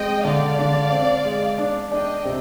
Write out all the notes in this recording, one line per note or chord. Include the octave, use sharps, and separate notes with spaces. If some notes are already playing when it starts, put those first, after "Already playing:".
Already playing: G#3 C4 D#5 G5
D3 D5 F5
D3
C4
G#3
D4
D4 D#5 G5
C3